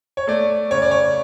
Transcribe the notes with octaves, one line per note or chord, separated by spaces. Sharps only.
C#5
A3 D5
C#3 C#5
D5
C#5